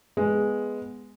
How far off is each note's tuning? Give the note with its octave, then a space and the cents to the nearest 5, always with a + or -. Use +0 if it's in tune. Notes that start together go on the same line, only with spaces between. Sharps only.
G#3 +0 B3 +5